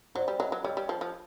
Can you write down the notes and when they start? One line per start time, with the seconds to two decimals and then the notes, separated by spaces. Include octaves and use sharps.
0.15 F#3 C5 D5
0.28 G3
0.40 F#3 C#5 D#5
0.52 F#3
0.64 G3 C#5 D#5
0.77 G3
0.89 F3
1.01 F3